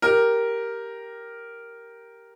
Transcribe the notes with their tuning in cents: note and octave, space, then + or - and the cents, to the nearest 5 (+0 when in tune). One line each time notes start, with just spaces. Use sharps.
G4 +0 A#4 +0